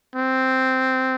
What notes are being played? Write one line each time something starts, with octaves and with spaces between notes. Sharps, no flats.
C4